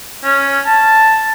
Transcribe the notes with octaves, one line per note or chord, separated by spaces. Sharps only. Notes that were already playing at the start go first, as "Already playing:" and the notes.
C#4
A5